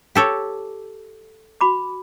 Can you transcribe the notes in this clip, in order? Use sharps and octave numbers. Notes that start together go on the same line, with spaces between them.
G4 A4 C#5
F#4 B5 D6